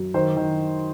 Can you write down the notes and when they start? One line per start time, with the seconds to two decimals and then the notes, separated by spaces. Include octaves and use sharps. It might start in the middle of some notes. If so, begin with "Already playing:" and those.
Already playing: F#2
0.14 D#3 C5
0.36 D#3